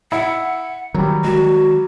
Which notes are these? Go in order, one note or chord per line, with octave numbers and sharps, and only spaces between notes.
E4 F#5
D#3 F#3 G3
D#3 G#3 F#4